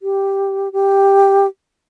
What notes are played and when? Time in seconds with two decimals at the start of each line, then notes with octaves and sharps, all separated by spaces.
0.02 G4
0.73 G4